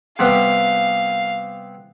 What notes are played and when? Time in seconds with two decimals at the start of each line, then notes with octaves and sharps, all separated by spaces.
0.19 C3 G3 B3 F5